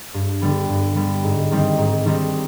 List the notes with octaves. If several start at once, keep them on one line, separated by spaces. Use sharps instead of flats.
G2
D3 G3 B3
G2
D3 G3 B3
G#2
D#3 G3 C4 D#4
G#2
D#3 G3 C4 D#4